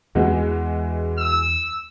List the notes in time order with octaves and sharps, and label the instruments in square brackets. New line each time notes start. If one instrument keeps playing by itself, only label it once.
[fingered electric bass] E2 B3 [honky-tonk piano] E3 G#3 F#4
[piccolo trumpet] E6